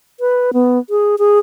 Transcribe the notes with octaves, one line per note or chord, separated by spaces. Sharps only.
B4
B3
G#4
G#4